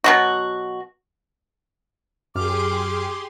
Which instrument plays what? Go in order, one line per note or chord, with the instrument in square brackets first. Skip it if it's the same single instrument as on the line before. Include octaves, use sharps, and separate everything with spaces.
[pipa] B2 F#3 F#4
[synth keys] F#2 F6 [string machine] G4 G#4 C6 [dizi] D6